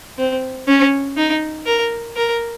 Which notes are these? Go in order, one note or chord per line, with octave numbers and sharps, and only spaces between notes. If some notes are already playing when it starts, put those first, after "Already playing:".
C4
C#4
D#4
A#4
A#4